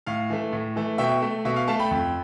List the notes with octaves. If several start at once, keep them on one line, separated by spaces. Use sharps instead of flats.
A2 F5
E3 A3
A2
E3 A3
B2 E5 G5
A3
B2 E5
F5
A3 F5 A5
G5 B5
F2